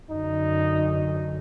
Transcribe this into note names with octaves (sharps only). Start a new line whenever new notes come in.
F#2 D3 D#4